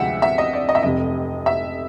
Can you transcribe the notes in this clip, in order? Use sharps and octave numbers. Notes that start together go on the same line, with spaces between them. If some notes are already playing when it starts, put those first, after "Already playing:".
Already playing: D2 C3 F3 G#3 E5 F#5
E5
D#5
D5
D#5
E5
F1 F2 C3 D#5
E5